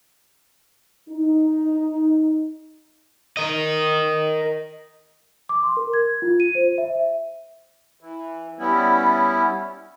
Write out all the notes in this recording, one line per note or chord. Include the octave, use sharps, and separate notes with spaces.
D#4
A#4 D#5
D6
C6
A#4
G#6
F4
D#7
C5
E5
E3
G3 B3 C#4 E4